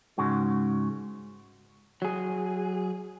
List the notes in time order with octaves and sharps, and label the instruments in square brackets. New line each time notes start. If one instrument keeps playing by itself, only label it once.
[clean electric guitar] G#2 C#3 G#3 F#4
[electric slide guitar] F#3 G#4